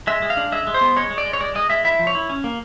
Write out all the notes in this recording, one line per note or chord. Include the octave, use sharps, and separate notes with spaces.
G#3 E5
G#3
F5
D4
G#3 E5
G#3
C5
B3
G#3 C#5
G#3
D5
G#3
C#5
G#3 D5
G#3 D#5
G#3 E5
E4 E5
F3
C#5
E4
C#4
A#3